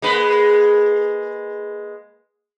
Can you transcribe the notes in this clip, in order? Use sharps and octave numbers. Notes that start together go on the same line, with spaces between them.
G#3 A#3 B4